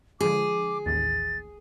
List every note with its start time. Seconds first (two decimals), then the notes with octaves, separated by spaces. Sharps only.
0.21 D3 F3 G#3 G#4 D6
0.86 A1 D#2 A6